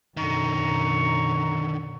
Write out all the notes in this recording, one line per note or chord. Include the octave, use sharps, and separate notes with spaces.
F#2 B2 D3 D#3 A#5 C#6